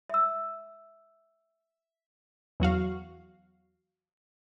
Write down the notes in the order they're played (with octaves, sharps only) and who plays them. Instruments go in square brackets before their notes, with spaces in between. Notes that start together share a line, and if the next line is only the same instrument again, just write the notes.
[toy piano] E5 E6
[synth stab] E2 F#3 F#4 F5